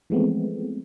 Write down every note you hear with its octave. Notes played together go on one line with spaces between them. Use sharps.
E3 F3 G#3 A3 B3 C4